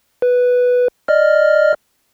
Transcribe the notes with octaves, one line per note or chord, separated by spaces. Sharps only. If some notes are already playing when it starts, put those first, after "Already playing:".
B4
D5 D#5 F6